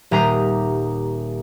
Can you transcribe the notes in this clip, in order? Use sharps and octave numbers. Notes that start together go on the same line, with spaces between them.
D#1 G4 A#5 D#6 C7